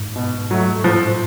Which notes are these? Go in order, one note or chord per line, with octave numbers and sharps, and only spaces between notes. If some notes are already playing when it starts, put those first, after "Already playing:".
Already playing: G#2
B2
F#3 A3
A2 F3